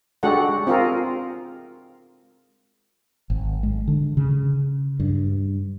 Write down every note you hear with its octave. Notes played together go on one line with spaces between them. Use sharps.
G#3 D4 F#4 G4 A4 F#5
C4 F4 G#4 A#4
G#1
G#3
D3
C#3
G2